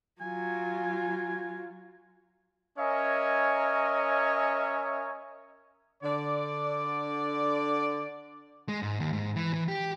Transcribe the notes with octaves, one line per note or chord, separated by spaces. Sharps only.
F#3 F4 G#5
C#4 A#4 C#5 D#5 E5 G#5
D3 D5
G#3
G#2
D#2
G#2
E3
E3
G4